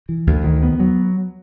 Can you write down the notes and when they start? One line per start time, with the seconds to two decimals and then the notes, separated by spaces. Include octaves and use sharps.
0.09 E3
0.27 D2
0.44 D#3
0.63 B3
0.80 F#3